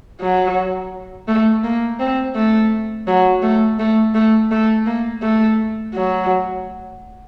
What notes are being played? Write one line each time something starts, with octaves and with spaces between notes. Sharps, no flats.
F#3
A3
A#3
C4
A3
F#3
A3
A3
A3
A3
A#3
A3
F#3